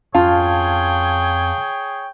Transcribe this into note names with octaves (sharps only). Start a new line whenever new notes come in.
F2 C#4 F4 G#4 C#5 F5 G5 A5